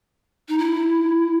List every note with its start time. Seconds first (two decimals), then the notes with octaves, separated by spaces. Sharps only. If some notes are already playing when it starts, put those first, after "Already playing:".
0.49 D#4
0.58 E4